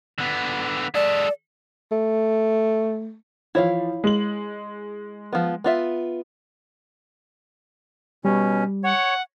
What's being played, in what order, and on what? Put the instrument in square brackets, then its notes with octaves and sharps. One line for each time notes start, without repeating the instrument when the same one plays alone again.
[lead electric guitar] D3 B3
[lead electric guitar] G#3 A4 [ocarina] D5
[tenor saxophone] A3
[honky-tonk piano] E3 F3 [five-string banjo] E4 C#5 F5
[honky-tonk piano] G#3 F#7
[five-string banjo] F3 B3
B3 F4 E5
[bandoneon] B2 C#4 [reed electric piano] G3
[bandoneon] C#5 [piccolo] F#5